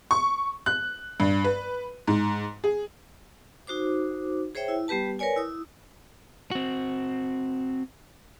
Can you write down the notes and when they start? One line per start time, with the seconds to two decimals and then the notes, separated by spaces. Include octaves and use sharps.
0.11 C#6
0.66 F#6
1.20 G2
1.44 B4
2.08 G#2
2.64 G#4
3.67 D#4 F#4 C5 D6
4.55 G#4 C5 C#5 E5 G5
4.68 E4
4.88 G3 B3 G4 B4 A5
5.19 A#4 B4 C#5 D5 G#5
5.36 E4 D#6
6.51 C4 F#4